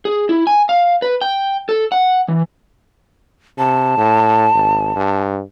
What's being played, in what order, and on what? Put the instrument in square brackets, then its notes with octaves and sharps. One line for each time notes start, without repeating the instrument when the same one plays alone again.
[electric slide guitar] G#4
E4
G#5
F5
B4
G5
A4
F#5
E3
[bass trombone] C3 [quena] A5
[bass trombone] A2
G#1
G2